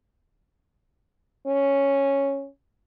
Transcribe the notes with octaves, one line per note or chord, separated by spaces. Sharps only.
C#4